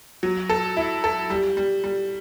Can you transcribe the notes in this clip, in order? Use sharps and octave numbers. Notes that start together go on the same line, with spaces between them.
F#3
A4
E4
A4
G3
G3
G3